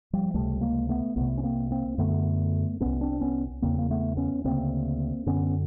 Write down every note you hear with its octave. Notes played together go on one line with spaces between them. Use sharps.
F3 G3
C#2 C3 G3 A3
G#3 A#3
A3 B3
C2 C3 A3 B3
C#4
A#3 C4
A#3 C4
F#2 D3 A3 B3
C2 A#2 B3 C#4
C4 D4
B3 C#4
E2 C#3 A#3 C4
A#3
A3 B3
B3 C#4
D2 C#3 A#3 C4
F#2 D3 B3 C#4